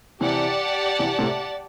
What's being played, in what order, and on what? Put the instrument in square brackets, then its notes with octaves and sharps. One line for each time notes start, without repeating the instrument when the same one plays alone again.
[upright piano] C3 E3 [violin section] G4 D5 F#5 A5
[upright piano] C3 E3
A2 C3